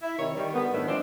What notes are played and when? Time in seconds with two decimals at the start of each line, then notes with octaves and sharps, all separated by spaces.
0.02 E4
0.19 C3 D#3 C#5
0.36 D#3 G3
0.54 D3 G3 B3
0.73 F#2 A2 D#3 D4 E4
0.87 F3 G#3 C4 D4